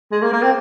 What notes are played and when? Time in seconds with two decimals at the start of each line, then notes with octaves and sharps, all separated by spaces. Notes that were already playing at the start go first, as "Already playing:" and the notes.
0.12 G#3
0.22 A#3
0.33 A#3
0.43 C4